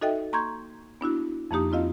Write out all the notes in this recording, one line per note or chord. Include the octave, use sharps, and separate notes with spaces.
D#4 F#4 A4 D#5 E5 G5
A#3 A#5 C6 C#6 G6 G#6
B3 D4 E4 F#4
F2 F3 A#3 D#4 G4 D#6
C4 E4 F4 D#5 F5